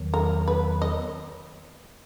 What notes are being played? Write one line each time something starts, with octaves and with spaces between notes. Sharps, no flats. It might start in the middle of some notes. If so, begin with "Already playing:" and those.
Already playing: E2 D#3 F#3
A#4
B4
D#5